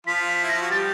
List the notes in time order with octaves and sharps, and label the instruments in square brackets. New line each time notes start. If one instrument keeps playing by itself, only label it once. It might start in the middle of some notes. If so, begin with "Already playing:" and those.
[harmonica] F3 F4 [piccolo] B6
[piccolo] B6
[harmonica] E4
[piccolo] A#6
[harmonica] F4
F#4
[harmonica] G3 G4 [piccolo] A6